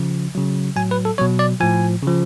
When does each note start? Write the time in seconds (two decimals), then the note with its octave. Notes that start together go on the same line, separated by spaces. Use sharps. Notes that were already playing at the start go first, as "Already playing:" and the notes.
Already playing: C#3 F3
0.35 C#3 F#3
0.76 A2 F#3 G#5
0.91 B4
1.05 A4
1.18 B2 F#3 C#5
1.39 D5
1.60 A2 F3 G#5
2.03 C#3 F3